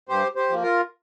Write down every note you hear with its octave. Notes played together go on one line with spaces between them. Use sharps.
G2 G4 C5
G4 C5
F3 A#3
F4 A#4